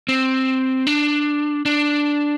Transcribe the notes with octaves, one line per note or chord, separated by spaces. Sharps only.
C4
D4
D4